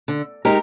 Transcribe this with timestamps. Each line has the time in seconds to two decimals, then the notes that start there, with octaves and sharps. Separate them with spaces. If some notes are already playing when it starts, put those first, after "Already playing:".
0.08 D3
0.45 G#3 D#4 G4 A#4